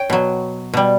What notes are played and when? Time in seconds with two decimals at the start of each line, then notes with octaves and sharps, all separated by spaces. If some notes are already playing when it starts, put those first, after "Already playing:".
Already playing: C#5 G5
0.10 B2 F#3
0.74 B2 G3